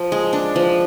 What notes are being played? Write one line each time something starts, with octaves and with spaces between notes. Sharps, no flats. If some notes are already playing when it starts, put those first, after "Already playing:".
Already playing: F3
G#3
D4
F3